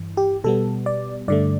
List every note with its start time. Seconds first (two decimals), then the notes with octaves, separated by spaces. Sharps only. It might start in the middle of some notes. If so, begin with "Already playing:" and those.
Already playing: G2 E3
0.17 G4
0.44 B2 G3 B3 A4
0.86 D5
1.28 G2 D3 A3 D5